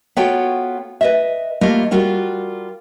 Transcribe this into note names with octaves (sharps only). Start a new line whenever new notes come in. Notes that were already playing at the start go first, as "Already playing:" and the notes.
B3 F4 F#4 A4 C#5 G5
B4 D#5 E5
G3 A3 A#3 F4 D#5
G3 F4 F#4 A#4